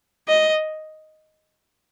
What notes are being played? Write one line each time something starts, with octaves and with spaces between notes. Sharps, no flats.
D#5